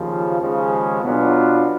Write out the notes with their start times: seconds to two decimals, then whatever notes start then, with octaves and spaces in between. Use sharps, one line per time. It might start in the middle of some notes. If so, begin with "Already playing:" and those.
Already playing: D#2 C#3 F3
0.41 D#2 C#3 F3 G#3 C#4
1.02 B2 F#3 B3 D4 F4